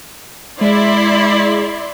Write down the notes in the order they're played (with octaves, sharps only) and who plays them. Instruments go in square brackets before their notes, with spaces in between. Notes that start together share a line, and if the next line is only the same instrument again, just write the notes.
[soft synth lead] G#3 [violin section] E4 D5 C6